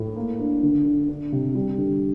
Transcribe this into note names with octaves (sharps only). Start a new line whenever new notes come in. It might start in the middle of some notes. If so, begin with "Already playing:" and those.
Already playing: A2
A#3
D4
D3
D3
D4
C3
G3
D3